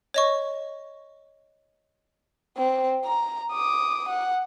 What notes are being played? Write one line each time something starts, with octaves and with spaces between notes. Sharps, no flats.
C#5 D#5 C#6
C4
A#5
D6 D#6
F#5